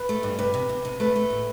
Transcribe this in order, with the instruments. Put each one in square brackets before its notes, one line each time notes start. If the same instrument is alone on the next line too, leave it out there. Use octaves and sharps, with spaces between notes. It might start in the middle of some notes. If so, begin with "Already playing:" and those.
Already playing: [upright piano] B4
[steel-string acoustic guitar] A3
G2
[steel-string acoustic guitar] C3 [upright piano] B4
[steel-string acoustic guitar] C3
C3
C3
[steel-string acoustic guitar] A3 [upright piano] B4
[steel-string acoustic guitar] A3
A2